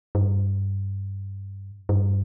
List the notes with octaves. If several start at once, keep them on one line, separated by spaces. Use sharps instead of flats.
G2
G2